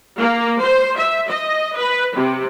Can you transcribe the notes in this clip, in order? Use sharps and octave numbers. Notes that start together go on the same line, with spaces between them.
A#3
C5
E5
D#5
B4
C3